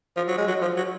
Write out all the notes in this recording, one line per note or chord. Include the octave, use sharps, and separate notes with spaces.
F3
F#3
G#3
F#3
F3
F#3